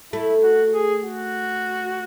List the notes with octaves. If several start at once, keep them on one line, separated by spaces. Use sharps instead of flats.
A3 E4
F#4
G#4
F#4